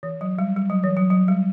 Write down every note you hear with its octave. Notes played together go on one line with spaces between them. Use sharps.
E3
F#3
G3
G3
F#3
E3
F#3
F#3
G3